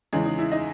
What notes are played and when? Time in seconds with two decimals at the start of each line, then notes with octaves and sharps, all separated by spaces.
0.13 E2 C#3 E3 G#3 G#4
0.26 D#4
0.39 E4
0.52 D#4 D#5